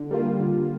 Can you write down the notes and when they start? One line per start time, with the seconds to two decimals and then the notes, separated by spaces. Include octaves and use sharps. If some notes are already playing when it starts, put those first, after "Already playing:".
Already playing: D3
0.11 G3 A#3 F4
0.40 D3